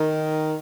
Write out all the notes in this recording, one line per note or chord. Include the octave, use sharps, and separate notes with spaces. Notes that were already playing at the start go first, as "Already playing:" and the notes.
Already playing: D#3